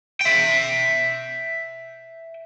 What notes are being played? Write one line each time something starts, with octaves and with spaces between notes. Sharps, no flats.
E5 G5